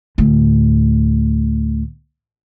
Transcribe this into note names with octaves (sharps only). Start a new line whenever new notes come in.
D2 A2